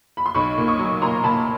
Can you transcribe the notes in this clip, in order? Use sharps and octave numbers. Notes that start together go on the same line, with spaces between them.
B5
C6
B1 B5 C#6
A#2
C#6 D#6
F#3
A#2 A#5 C6
A#2 A5 B5